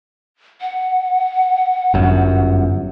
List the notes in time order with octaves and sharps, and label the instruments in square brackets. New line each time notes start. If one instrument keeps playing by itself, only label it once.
[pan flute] F#5
[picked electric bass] G1 F#2